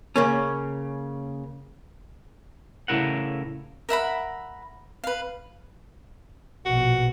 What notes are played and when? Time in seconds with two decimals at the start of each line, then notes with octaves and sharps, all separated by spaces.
0.16 C#3 A#3 C#4
2.88 A2 C#3 F#3 E4 A#4 F#5
3.89 A#4 E5 F#5 B5
5.04 B4 F5
6.65 A#1 B2 F#4